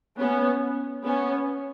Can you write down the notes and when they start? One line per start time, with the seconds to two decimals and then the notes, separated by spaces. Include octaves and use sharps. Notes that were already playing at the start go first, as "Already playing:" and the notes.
0.19 B3 C#4
1.05 B3 C#4